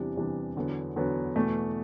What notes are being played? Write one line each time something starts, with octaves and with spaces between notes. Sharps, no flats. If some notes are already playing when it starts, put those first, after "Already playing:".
Already playing: E2 C3 E3 G3 D4
E2 C3 E3 G3 D4
E2 D3 F#3 B3
E2 D3 F#3 B3
E2 B2 A3